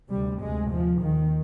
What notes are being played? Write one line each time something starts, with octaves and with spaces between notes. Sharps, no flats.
D2 C3 G3
D2 C3 G#3
D#2 F3
D#2 D#3